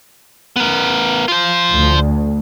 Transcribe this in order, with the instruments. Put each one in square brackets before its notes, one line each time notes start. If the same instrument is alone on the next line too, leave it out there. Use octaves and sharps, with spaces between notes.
[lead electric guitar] B3 A#4
F4 C5
[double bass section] D2